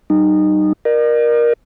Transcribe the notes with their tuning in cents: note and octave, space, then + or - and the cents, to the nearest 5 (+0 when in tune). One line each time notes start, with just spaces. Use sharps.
G3 -40 D#4 -20
A#4 +15 D5 +45